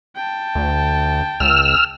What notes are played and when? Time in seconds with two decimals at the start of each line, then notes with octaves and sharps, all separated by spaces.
0.16 G5 A5
0.55 D2
1.40 C#2 E6 F6